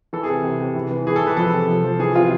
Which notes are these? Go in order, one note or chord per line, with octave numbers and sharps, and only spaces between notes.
E3 A4
G#4
C3
C3
C3
E3
E3
E3 G#4
A4
E3
B4
F3 A4
C3
F3
F3
E3 G#4
C3 F4